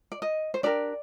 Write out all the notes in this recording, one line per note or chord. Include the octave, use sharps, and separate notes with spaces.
D5
D#5
C5
D4 G4 A#4 D5